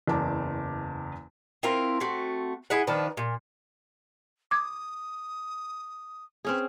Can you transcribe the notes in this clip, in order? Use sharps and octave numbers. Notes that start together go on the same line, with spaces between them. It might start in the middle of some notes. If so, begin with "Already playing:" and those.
F#1 E2 A5 D6
C4 E4 F4 A#4
A3 C4 F#4
E4 G#4 E5 F#5
D#3 F3 D4 B4
A#2
D6 D#6 G#6
C4 C#4 G#4 B4